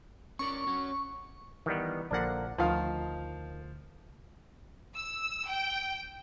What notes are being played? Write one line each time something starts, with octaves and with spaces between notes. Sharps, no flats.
C#4 A#4 D5 C#6
C#4 F#4 C#5
D#3 E3 G3 B3
A#1 D3 F3 A#3 D4 F#5
D2 D#3 F3 F5
E6
G5